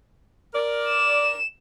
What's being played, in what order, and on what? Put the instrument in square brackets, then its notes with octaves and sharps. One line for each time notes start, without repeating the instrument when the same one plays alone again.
[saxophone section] A#4 D5
[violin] E7